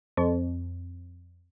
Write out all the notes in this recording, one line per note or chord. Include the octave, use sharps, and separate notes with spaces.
F2